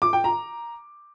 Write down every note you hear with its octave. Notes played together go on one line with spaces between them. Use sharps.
D6
G5
A#5